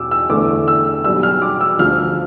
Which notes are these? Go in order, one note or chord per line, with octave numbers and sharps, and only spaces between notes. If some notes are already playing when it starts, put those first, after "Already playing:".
Already playing: E2 B2 D6 E6
E6
E2 D3 A3 D6
E6
B1 B2 G3 E6
F6
D6
E6
D2 D3 F3 F6